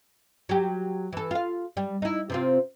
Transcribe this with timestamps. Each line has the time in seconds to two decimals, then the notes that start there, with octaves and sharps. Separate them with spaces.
0.49 F#3 G4
1.13 E3 A4
1.31 F4 F5
1.77 G3
2.02 D#4 E4
2.30 C3 C4 F4